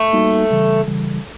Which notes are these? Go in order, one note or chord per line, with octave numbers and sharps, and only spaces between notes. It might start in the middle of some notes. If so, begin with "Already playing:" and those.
Already playing: A3
G3 A#3 D#4 F#4
C#3 E3 G3
C#3 E3 G3